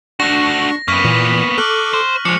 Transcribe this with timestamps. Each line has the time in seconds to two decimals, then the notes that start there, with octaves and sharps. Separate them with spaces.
0.20 A3 D4 F#4 C#6 A#6
0.88 F#2 A#3 B3 C#6 B6 D#7
1.05 A#2 E3
1.58 A4 D6 F6 F#6 F#7
1.93 C5
2.25 F3 G#3 D4 C#7